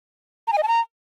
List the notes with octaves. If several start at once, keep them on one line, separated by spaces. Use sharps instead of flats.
A#5
G#5
D#5
A5
A#5